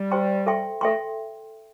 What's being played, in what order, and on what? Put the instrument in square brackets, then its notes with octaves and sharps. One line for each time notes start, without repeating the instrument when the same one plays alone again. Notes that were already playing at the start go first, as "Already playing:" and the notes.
Already playing: [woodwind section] G3
[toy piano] G4 C5 G5 C6
A4 E5 G5 C6
[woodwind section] A3 [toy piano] A4 E5 G5 C6